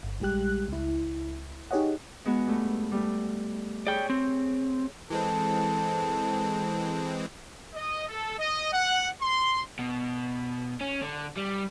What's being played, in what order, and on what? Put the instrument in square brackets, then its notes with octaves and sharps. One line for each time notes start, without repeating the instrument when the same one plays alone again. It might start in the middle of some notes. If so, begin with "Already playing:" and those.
[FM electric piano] G1
A#1 G3 G#3 G4 F#6
C#2 E4
D#4 G4 G#4 C#5 D#5 F#5
[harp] G#3 B3 F#4
G2 A3
G3 A3
[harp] G#4 C#5 [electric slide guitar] D5 G5
[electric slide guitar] C4
[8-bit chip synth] E3 G#3 C4 [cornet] A4
[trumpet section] D#5
A4
D#5
F#5
C6
[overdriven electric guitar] B2
C#4
D3
G3